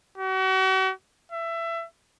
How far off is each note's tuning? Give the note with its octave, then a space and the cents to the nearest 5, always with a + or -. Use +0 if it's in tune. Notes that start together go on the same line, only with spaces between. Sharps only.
F#4 +40
E5 +20